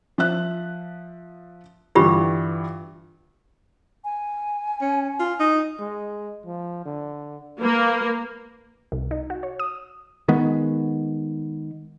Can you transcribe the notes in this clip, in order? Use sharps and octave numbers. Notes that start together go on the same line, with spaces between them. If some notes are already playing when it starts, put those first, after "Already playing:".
F3 E5 F#6
G2 D3 E3 F4 G4 B5
G#5
C#4
F4
D#4
G#3
F3
D3
A#3 B4
C2
D#4
F#4
C#5
D#6
D#3 G#3 B3